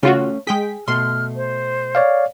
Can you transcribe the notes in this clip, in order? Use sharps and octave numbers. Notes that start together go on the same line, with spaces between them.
C#3 A3 C#4 F4 F#4 F5
G#3 G#4 G5 B6
B2 A3 C6 F6
C5
C#5 D5 F5